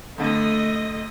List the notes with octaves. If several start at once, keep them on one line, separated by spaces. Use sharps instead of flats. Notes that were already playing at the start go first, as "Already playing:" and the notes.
F2 D3 A3 D#5